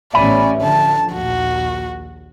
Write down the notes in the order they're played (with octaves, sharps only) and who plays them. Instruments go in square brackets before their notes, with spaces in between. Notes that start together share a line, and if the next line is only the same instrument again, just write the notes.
[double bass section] A1 B3 C#4 [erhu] D5 [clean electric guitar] E5 G#5 B5
[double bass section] D3 F3 [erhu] A5
[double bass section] A#1 D#2 [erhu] F#4